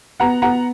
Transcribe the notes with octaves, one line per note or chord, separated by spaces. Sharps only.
B3 F#5 A#5
B3 F#5 A#5